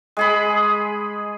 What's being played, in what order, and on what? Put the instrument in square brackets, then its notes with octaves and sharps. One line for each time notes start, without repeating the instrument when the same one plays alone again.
[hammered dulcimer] G#3 G#4 B5